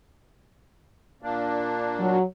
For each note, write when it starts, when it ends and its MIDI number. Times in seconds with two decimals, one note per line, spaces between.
1.23 2.19 46
1.23 2.19 58
1.23 2.19 62
1.99 2.24 54